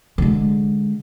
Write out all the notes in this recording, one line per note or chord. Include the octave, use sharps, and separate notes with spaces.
D3 G#3